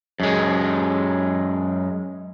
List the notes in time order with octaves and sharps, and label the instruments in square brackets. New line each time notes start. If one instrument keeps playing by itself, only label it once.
[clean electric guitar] F#2 G#3